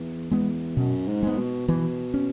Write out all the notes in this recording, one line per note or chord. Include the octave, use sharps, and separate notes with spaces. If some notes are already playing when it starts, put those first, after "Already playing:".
Already playing: E2
E2 G#3 B3
F#2 B2
G#2
G#3 B3
B2
B2 E3
C#4